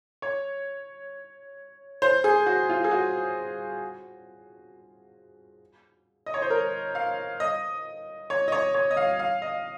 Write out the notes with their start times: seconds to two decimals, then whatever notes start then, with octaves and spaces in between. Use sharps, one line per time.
0.22 C#5
2.02 C5
2.24 G#4
2.46 F#4
2.69 F4
2.84 G#4
2.91 F#4
6.26 D#5
6.34 C#5
6.42 C5
6.50 A#4
6.95 F5
7.40 D#5
8.30 C#5
8.48 D#5
8.52 C#5
8.74 C#5
8.91 D#5
8.97 F5
9.19 F5
9.42 D#5